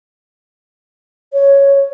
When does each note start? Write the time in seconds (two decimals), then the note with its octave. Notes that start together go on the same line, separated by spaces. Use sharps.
1.33 C#5